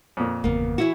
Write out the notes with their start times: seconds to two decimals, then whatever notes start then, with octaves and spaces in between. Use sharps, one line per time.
0.17 F2 A#2
0.44 G1 E2 C#3 A#3 B3
0.78 E3 E4 F#4